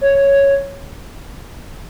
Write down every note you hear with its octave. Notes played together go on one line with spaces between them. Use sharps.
C#5